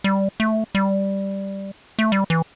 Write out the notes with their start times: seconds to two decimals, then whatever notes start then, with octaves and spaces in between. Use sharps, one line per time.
0.04 G3
0.40 A3
0.75 G3
1.99 A3
2.12 G3
2.30 E3